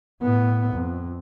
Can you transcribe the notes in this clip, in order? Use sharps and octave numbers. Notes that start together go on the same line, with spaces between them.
A2 B3
F2